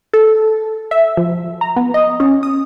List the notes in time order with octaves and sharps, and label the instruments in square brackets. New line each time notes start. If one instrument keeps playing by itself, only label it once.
[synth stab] A4
E5
F3
A#5
B3
D#5
C#4
D#6